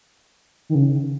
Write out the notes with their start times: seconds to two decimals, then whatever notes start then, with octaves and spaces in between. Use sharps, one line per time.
0.69 D#3
0.75 C#3